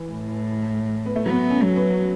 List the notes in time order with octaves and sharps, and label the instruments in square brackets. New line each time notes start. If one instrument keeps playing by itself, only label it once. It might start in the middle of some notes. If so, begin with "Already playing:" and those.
Already playing: [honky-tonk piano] E3
[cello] A2
[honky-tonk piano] B3
A3
[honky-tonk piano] F#3 [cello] B3
[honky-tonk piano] C#4
[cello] F#3
[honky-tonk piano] B3